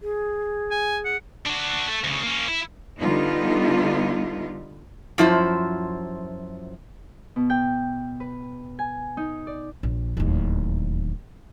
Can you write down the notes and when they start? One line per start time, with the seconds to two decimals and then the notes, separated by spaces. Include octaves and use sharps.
0.01 G#4
0.71 G#5
1.05 F#5
1.46 D4 F#4
1.88 A3
2.04 D2 C#3
2.23 A#3 C#4
2.48 E4
2.99 D3 G3 B3 D#4 F4
5.18 F#2 F3 E4 C5
7.36 B2
7.50 G5
8.20 B4
8.79 G#5
9.17 D#4
9.47 D5
9.83 A#1
10.17 D1 D#2